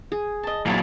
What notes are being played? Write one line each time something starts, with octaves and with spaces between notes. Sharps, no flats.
G#4
D#5 A5
A#2 F#3 D#4 E4 C#5 A5